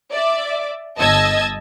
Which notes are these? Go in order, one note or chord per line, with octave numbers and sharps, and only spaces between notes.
D5 E5 D6
G1 D#5 A5 E6 G#6